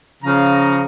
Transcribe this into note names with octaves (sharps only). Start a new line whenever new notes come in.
C#3 F3 A#5